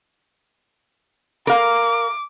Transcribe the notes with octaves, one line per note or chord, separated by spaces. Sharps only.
A#4 F5 D6